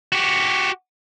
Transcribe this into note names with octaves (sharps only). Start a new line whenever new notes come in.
F#4 G4